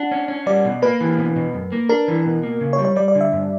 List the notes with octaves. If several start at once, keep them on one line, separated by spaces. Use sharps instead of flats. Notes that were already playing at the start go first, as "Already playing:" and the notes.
Already playing: D4 F#5
C#4
C#4
G3 D5
B2
A#3 B4
E3
B2
B2
F#2
A#3
D4 A#4
E3
B2
A#3
C#3
C#5
G3
C#5
G3 D5
D5
D3
E5
G2